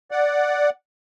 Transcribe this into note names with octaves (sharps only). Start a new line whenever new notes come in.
D5 F#5